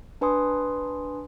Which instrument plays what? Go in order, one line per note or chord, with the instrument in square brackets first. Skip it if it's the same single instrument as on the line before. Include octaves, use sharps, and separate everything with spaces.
[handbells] D4 B4 G#5 C6 D#6